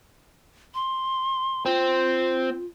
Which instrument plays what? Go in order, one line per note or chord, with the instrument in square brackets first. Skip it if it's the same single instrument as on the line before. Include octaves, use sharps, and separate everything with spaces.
[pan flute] C6
[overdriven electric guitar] C4 [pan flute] F4